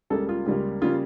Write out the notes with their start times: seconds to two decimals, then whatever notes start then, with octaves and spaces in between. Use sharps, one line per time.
0.10 C#2 C#3 G3 A#3 A4
0.29 F4
0.46 C#2 C#3 G3 A#3
0.82 C#3 G3 A#3 F4